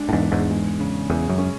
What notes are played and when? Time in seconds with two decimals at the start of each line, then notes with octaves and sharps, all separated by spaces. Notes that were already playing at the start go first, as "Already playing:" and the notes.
Already playing: G#3 D4
0.09 A2
0.13 E2 G#2
0.22 D4
0.32 E2 G#2
0.51 G#3
0.80 C#3
1.10 E2 G#4
1.29 F#2
1.38 C#4